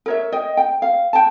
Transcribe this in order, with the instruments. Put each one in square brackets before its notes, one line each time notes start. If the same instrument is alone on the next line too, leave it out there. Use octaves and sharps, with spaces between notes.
[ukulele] A#4 C#5 E5
D#5 G5
G5
F5
G5 A5